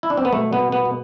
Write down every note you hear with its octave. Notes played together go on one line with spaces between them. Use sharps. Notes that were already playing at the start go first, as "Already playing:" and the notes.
E4
D4
C4
B3
B2 A3
B3
B2
B3
B2